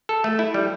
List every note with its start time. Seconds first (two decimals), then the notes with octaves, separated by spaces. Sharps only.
0.09 A4
0.24 A3
0.39 E4
0.54 G3